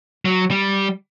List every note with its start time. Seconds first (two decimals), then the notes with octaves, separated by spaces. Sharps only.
0.25 F#3
0.51 G3